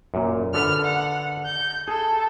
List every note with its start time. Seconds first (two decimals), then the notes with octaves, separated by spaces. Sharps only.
0.14 F#2 A#2
0.54 D3 A4 B4 F6
0.85 F#5
1.46 G6
1.88 G#4 A4